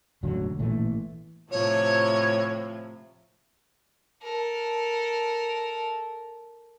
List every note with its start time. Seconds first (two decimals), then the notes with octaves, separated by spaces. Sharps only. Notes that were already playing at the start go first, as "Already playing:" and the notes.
0.23 E1 A1 D3 F#3
0.59 A1 A#2 E3 A3
1.51 A2 C3 F3 C#5
4.22 A4 A#4